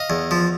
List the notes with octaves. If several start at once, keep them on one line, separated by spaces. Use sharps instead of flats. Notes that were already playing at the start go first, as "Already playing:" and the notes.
Already playing: D#5 F5
E2
F3